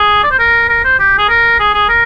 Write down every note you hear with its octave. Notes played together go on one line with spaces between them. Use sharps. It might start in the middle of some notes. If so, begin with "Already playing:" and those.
Already playing: G#4
D5
C5
A#4
A#4
C5
G4
G#4
A#4
G#4
G#4
A#4